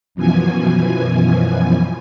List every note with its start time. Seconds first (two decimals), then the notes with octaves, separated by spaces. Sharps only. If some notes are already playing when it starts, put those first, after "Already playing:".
0.15 F#2 B2 E3 F3 G#5